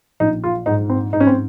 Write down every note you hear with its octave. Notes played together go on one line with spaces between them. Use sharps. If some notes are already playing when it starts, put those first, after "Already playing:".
A#1 D#4
F4
G#2 D#4
C4
G#2 D#4
C#4
C4